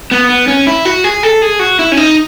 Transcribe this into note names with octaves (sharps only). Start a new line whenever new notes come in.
B3
B3
C#4
E4
F#4
G#4
A4
G#4
F#4
E4
C#4
D#4